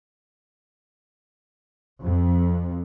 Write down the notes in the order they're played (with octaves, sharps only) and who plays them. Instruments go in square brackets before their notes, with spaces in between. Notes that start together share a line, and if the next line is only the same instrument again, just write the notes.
[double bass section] F2